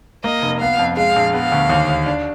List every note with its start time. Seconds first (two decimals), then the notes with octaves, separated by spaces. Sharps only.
0.24 A#3 D#5
0.42 F1
0.60 B3 F5
0.79 F2
0.97 G#3 F5
1.16 A#1
1.34 B3 F5
1.52 D2
1.70 D#2
1.89 D#2
2.06 D4